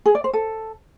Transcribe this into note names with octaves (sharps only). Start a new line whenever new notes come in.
G#4
D5
C5
A4